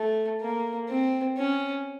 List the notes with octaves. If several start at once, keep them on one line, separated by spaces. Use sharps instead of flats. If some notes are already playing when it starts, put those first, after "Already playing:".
Already playing: A3
A#3
C4
C#4